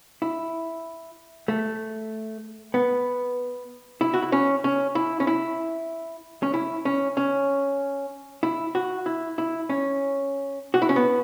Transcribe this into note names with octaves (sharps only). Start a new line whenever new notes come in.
E4
A3
B3
E4
F#4
E4
C#4
C#4
E4
C#4
E4
C#4
E4
C#4
C#4
E4
F#4
E4
E4
C#4
F#4
E4
C#4
B3